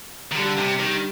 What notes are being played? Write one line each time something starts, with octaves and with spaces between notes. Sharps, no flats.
D#3
D3 G3
C3
D#3 G3